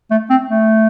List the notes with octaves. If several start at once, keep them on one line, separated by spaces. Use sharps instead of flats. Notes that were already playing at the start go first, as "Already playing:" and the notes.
A3
C4
A3